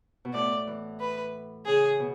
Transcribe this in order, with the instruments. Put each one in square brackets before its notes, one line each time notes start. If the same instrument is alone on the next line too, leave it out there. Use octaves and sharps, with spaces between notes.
[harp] B2
[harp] A2 [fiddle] D5
[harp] E3
[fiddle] B4
[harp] C#3 [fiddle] G#4
[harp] B2